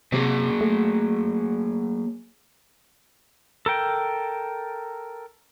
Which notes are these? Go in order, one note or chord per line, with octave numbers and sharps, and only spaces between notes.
C3 F#3 A#3 G#4
A3
A4 A#4 G5